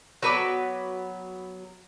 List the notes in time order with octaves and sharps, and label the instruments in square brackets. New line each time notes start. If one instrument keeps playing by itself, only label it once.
[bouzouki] F#3 B3 [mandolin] F#4 B4 D6